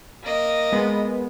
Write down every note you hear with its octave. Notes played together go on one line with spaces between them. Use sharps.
A#3 D#5
G#3 B3